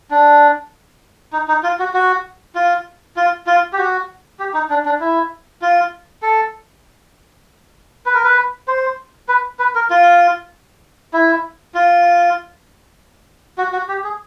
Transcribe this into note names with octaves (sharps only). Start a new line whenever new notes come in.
D4
D#4
D#4
F4
F#4
F#4
F4
F4
F4
G4
F#4
G4
D#4
D4
D4
E4
F4
A4
B4
A#4
B4
C5
B4
B4
A#4
F4
E4
F4
F#4
F#4
G4
G#4